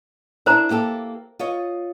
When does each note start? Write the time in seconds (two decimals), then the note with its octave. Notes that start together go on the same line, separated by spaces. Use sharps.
0.46 D4 E4 A#4 C5 A#5
0.70 A#3 G4 A4
1.39 F4 C#5 D#5